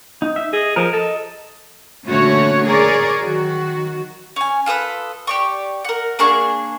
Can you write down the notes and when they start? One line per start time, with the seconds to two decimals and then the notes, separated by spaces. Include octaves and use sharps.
0.22 D#4
0.36 E5
0.53 G#4 D#5
0.76 F3 A#4
0.93 A4 D#5
2.05 A#2 D3 A3 C#4 F#4 C#5
2.66 G#4 A#4 C#5 D5
3.22 D#3 F#3 F#4
4.36 C#4 G#5
4.66 F4 A4 B4 D#6
5.27 G4 D5 C#6
5.84 A#4 F#5
6.19 A#3 D4 G#4 C#6